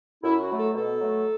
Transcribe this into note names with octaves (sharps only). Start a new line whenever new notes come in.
F#2 E4
F#4
F#3 A3
A4
B2 A4
F#3 A3